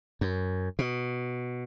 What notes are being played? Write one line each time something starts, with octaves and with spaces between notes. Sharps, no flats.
F#2
B2